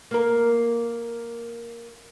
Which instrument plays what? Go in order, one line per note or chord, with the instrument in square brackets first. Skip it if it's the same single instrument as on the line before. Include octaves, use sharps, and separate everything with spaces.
[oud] A#3 A#4